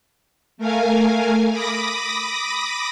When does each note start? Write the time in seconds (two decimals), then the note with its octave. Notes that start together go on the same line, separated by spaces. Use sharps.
0.58 A3 A#4 F5 G#5
1.51 B5 D6 D#6 A#6